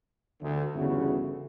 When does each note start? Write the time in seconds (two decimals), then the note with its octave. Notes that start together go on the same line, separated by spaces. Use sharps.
0.42 D2
0.74 G1 E2 C#3 A3 E4 F#4